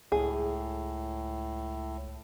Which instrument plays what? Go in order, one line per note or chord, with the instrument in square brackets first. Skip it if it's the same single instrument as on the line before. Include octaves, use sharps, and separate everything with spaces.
[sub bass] C#2 [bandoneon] A2 [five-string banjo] G#4